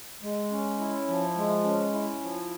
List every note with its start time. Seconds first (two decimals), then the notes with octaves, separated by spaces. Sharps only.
0.23 G#3
0.51 C#4
0.79 E4
1.08 F3
1.36 G#3
1.64 C#4
1.93 E4
2.21 F3